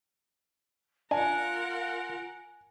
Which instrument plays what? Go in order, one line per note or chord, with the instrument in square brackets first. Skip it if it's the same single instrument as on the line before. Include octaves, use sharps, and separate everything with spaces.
[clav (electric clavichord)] D4 [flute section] F4 [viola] A#4 F#5 [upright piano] G#5